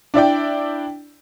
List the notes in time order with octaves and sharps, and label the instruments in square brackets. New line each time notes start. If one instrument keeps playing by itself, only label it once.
[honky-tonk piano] D4 E4 D5 G5